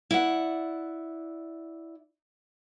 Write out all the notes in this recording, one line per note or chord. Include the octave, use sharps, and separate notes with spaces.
E4 D5 F#5